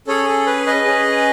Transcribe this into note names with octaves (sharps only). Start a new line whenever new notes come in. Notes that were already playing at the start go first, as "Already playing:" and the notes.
C#4 G#4 A4 C#5
A4
B4
B4 D#5
C#4 G#4